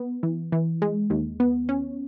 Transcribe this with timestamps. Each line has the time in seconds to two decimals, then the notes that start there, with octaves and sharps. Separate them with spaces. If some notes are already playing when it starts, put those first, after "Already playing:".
Already playing: B3
0.23 E3
0.52 E3
0.82 G#3
1.10 D#2
1.40 B3
1.69 C#4